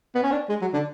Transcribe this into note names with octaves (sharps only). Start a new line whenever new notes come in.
B3
C#4
D4
G#3
F#3
D3